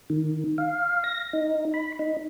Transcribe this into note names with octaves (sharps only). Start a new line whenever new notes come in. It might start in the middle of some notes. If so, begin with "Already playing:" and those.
D#3
F5
A#6
D#4
B5
D#4